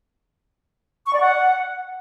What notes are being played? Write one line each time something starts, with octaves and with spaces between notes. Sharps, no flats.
C#6
D5
F#5